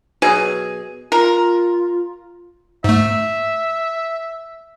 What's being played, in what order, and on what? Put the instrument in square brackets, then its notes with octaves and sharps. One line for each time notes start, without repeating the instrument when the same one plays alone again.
[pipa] B2 F#3 G#4
[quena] F4 [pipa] A#4
[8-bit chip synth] G#2 A3 [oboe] E5